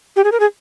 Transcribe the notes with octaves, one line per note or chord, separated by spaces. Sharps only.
G4
G#4
A#4
G#4